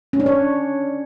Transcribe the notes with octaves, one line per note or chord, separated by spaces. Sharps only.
C#4
D4
C#5